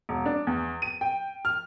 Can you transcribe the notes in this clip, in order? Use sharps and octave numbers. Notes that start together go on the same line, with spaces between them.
E1
D4
E2
D#7
G5
F6